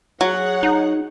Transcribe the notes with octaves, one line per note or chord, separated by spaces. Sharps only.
F#3 G#4 C#5 F#5
D#4